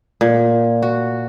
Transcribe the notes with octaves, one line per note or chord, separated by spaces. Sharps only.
A#2
F#4